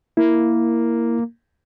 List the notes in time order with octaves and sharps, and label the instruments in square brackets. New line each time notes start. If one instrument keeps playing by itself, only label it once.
[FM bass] A#3 [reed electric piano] E4